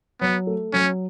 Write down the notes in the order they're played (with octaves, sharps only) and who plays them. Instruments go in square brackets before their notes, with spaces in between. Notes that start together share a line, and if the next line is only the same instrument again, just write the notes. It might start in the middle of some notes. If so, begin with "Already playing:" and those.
[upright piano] F#3 [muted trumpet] B3
[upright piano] A3
[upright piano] F#3 [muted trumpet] C#4